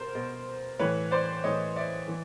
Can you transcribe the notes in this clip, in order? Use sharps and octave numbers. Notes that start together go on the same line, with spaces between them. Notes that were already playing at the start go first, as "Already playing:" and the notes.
Already playing: B2 A#4 C5
B2
A2 E3 B4 C#5
C5 D5
A2 E3 C#5 D#5
D5 E5
E3